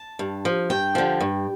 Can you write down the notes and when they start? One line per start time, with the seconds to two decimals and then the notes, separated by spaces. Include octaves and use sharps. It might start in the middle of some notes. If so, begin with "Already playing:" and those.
Already playing: A5
0.19 G2
0.45 F3
0.70 G2 G5
0.95 D3 F3
1.20 G2